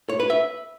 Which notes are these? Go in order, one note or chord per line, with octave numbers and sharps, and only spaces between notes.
C#5
B4
E5